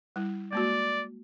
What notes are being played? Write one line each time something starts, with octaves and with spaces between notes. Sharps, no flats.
G3 E4
G#3 A#3 F#4 D5